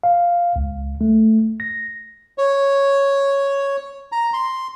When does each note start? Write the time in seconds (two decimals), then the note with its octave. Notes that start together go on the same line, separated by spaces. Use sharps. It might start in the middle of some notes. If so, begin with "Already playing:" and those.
0.04 F5
0.56 C#2
1.01 A3
1.60 A#6
2.38 C#5
4.12 A#5
4.33 C6